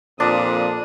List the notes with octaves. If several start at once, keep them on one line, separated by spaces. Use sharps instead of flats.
F2 A#2 D4 D5 D#6